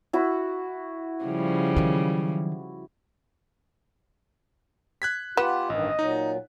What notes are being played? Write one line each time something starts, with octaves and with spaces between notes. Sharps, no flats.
E4 F#4
C#3 F3 G3
D#3 F#3
F#6 G#6 B6
B3 F4 G4 F#5 E7
A1 G2 D#3 D#5
A#2 F#3 D#4